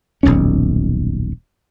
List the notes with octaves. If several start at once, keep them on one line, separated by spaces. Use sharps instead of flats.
D#1 B1 F2 C#4